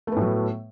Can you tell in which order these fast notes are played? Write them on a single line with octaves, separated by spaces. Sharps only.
A3 B3 A2 F#3